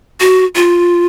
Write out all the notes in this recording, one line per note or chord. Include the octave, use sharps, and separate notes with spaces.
F#4
F4